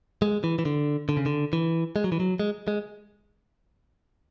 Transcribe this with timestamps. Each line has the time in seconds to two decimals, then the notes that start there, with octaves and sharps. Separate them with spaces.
0.22 G#3
0.44 E3
0.59 E3
0.65 D3
1.09 D3
1.17 C#3
1.26 D3
1.53 E3
1.96 G#3
2.04 F#3
2.12 E3
2.20 F#3
2.40 G#3
2.68 G#3